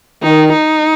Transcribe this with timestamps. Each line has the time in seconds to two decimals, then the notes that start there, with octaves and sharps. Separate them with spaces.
0.23 D#3 D#4
0.52 D#4